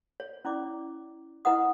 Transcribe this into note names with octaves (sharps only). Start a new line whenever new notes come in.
C#5
C#4 E4 D5 D6
E4 B4 D#5 F#5 D#6